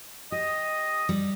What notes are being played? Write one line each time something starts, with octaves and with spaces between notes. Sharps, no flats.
G4 D#5 D#6
G3